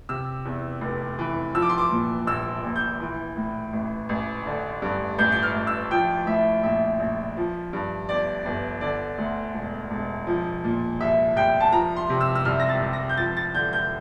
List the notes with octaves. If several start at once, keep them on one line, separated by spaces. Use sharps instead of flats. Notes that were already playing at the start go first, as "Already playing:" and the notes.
C3 E6
E2
F1
E3
F3 E6
D6
C6
D6
A#2
A#1 E6
A#1
G6
E3
A2
A1
A1
D3
G2
A1 G6
G6
F6
A1
E6
F3 G5
A2 E5
A#1 E5
A#1
F3
G2
G1 D5
G1
D3 D5
D2
E1
E1
F3
A#2
C2 E5
C2 G5
A5
F3 A#5
C6
C3
E6
E6
C2 F6
A#6
A6
C2
A#6
G6
F3 A6
A6
D3 G6
G6